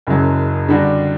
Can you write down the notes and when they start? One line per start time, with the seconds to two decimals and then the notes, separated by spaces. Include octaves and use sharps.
0.07 F#1 F#2 C#3 F#3
0.69 D3 G3 D4 F#4